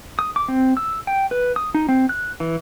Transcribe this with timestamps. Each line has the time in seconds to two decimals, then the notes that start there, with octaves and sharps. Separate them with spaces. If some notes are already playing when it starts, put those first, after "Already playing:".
0.19 D#6
0.36 D6
0.48 C4
0.77 E6
1.07 G5
1.31 B4
1.56 D#6
1.74 D#4
1.89 C4
2.09 F#6
2.40 E3